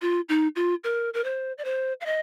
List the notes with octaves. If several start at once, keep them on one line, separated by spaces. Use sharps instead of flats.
F4
D#4
F4
A#4
A#4
C5
D5
C5
F5
D#5